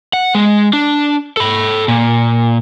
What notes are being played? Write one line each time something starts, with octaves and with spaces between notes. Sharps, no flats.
F#5
G#3
D4
A4 B5
A#2